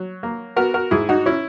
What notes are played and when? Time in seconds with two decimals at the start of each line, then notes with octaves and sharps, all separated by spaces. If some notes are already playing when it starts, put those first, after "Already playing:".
Already playing: F#3
0.23 A#3
0.56 B3 F#4 A#4
0.74 F#4 A#4
0.91 G#2 E4 G#4
1.09 D#4 F#4
1.26 C#4 E4